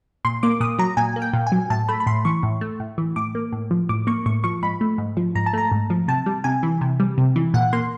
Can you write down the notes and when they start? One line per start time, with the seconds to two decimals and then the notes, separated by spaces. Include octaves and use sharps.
0.25 A#2 C6
0.43 A#3 D6
0.60 A#2 D#6
0.79 F#3 A#5
0.97 A#2 G#5
1.16 A#3
1.22 G5
1.33 A#2
1.47 G#5
1.52 F#3
1.70 A2 A5
1.89 A3 B5
2.00 B5
2.07 A2 C6
2.25 E3 C#6
2.43 A2
2.61 A3
2.80 A2
2.98 E3
3.16 A2 D6
3.35 A#3
3.52 A2
3.71 F3
3.89 A2 D6
4.07 A#3 C#6
4.26 A2 C#6
4.44 F3 C#6
4.63 G#2 B5
4.81 A3
4.98 G#2
5.17 F3
5.35 G#2 A#5
5.46 A5
5.54 A3 A#5
5.72 G#2
5.90 F3
6.08 C3 A5
6.26 G3
6.44 C3 G#5
6.63 E3
6.81 C3
7.00 G3
7.18 C3
7.36 E3
7.54 A#2 F#5
7.73 A#3 C6